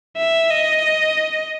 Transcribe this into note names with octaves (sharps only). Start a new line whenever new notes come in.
E5
D#5